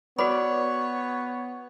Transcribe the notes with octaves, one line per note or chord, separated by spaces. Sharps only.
B3 F#4 B4 C#5 D5 B5